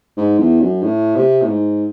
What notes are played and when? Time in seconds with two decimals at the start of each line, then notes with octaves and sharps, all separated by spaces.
0.17 G#2
0.38 E2
0.61 F#2
0.83 A2
1.16 C3
1.42 A2
1.48 G#2